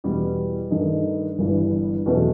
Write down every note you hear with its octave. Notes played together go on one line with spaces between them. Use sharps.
E2 B2 G3 B3
G2 D#3 A3 D#4
G1 G2 E3
E2 B2 F#3 A3